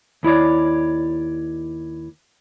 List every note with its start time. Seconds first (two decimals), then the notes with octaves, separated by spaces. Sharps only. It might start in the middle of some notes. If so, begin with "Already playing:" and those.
0.23 D#2 E4 C#5 D5